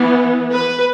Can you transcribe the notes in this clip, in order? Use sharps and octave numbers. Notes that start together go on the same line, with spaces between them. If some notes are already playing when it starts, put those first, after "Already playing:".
Already playing: E3 B3
B4